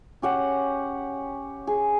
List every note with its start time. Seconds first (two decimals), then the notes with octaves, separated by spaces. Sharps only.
0.22 C#4 G4 F#5
1.67 G#4